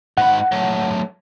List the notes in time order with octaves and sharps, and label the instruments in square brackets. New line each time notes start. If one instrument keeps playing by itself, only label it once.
[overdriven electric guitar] G#2 B5 [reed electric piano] F#5
[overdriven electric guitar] F#3 A3